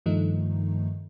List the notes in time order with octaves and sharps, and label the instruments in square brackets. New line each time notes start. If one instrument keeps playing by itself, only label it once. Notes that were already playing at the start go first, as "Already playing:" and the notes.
[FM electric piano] G2 D#3 F3 A3 D#4